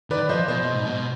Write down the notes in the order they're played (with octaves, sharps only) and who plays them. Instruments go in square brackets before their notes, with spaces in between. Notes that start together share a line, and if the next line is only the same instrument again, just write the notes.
[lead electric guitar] D#3 [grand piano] B4 D5
[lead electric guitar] F3 [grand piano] C5 D#5
[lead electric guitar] B2 [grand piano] C5 D#5
[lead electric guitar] B2
G#2
B2